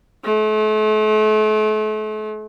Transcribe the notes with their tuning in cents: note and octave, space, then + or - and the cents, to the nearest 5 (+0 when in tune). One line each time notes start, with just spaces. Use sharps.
A3 -40